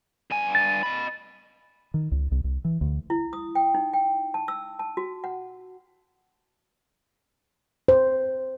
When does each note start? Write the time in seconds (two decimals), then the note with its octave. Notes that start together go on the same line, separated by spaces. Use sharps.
0.31 G2 G#5
0.55 A6
0.83 D#5 B5
1.94 D#3
2.12 C#2
2.31 C2
2.44 C2
2.65 E3
2.81 D2
3.10 E4
3.33 D#6
3.55 G5
3.75 D#4
3.93 G5
4.34 A5
4.48 E6
4.79 A5
4.97 F#4
5.24 F#5
7.88 C5